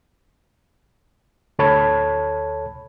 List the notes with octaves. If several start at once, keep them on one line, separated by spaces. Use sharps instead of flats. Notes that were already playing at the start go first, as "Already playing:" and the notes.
D2 A4 C#5 A5 B5 G#6